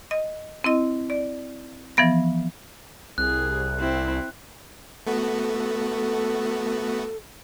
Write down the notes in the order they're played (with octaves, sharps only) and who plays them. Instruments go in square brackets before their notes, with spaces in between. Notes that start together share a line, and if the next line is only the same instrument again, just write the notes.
[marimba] D#5
C4 E4 D#5
D5
E3 F3 B3 A#6
[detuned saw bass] C2 [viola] G#4 [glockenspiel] F#6
[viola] C4 E4
[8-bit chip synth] A3 B3 F#4 [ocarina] A4